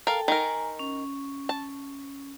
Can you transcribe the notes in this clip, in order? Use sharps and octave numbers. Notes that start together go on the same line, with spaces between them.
A4 A#4 F5 G5 A5
D#3 A#4 G#5 A#5
C#4
A5